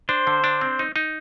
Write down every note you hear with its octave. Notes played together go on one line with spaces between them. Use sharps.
D4 C5
D3
D4
C4
D#4
D#4